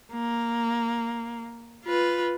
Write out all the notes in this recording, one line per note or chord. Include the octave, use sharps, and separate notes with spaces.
A#3
F4 B4